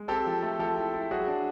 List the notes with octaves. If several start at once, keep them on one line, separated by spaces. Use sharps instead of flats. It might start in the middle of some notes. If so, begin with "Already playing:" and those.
Already playing: G#3
C4 G4 A4
F3
A3
F3 G4 A4
E4
E4
F#3 F#4 G#4
D4